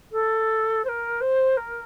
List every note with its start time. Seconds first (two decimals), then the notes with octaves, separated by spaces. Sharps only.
0.12 A4
0.84 C5
0.88 A#4
1.21 C5
1.57 A#4